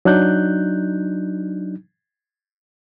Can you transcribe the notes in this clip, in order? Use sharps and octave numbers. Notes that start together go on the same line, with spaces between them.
F#3 D4 D#4 F#6 G6